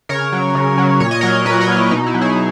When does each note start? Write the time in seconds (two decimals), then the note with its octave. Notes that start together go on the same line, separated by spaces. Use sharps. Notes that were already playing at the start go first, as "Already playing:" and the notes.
0.09 C#3 A#4 C#5
0.32 F#3
0.55 C#3
0.78 F#3
1.00 A#2 C#5
1.11 D#5
1.21 F#3 A#4 C#5
1.45 A#2 B4 D#5
1.61 A#4 C#5
1.68 F#3
1.76 E4
1.91 B2 D#4
2.06 E4
2.14 F#3
2.21 E4 G#4